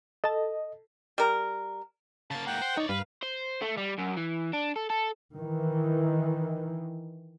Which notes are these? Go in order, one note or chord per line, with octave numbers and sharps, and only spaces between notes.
A4 D#5 A5
G3 A#4
C#3 A#3 A5
G#2 A#3 F#5 G5
C5
D#4 C#5 D5
G2 B4 F5
C5
A3
G3
F#2
E3
D4
A4
A4
D#3 E3